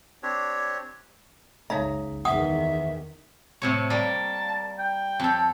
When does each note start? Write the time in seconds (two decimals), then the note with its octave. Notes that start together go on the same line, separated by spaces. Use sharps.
0.23 C4 D4 G4 C#5
1.70 F#1 C#2 D#4 C#5 E5 F5 A#5
2.25 E2 D#3 E5 F#5 D#6
3.62 A2 C3 C#5
3.90 G3 A#3 A5
4.79 G5
5.20 F2 A4